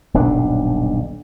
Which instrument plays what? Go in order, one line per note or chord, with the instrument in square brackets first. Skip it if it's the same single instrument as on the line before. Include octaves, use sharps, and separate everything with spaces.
[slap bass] D#1 B1 G2 D4